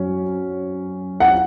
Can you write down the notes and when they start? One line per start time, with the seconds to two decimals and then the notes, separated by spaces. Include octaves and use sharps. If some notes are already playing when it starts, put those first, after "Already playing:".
Already playing: F#2 F#3 C#4
1.20 F#5